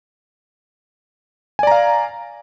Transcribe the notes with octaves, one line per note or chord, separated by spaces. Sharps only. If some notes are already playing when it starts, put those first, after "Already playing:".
D5 F5 G#5 A#5